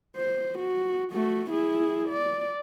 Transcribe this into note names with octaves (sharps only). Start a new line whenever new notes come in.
C5
F#4
A3 F#4
E4 G#4
D5